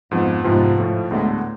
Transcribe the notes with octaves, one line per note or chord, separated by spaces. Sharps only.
F2 G#2 F3 B3
C2 G#2 C3 F3 B3 F4
A2 F3 A3
D2 A2 D3 G#3 B3